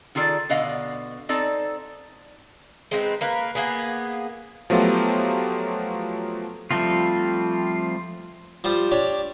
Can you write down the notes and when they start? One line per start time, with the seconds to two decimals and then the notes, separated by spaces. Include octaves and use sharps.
0.15 D#3 F4 G#4 A4 D5
0.50 B2 D3 B3 D#5 F5 F#5
1.29 C4 D#4 A4 D5
2.91 G#3 C4 D#4 B4
3.21 A#3 A#4 B4
3.55 A#3 B3 G#4 B4
4.70 F3 F#3 A3 B3 F4 G4
6.71 F3 G3 A3 C4 F4
8.64 F3 G3 C5
8.91 D4 G4 C#5 D5